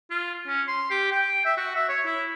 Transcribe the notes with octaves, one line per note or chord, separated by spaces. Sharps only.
F4
C#4
C6
G4
G5
E5
F#4
E5
C#5
E4